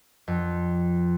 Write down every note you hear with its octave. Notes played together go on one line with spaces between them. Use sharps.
F2